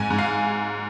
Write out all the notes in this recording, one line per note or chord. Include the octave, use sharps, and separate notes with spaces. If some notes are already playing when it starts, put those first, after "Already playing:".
Already playing: G#2 G#5
G#2
F5